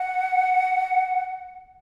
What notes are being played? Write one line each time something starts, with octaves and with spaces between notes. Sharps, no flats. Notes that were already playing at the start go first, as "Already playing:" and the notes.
Already playing: F#5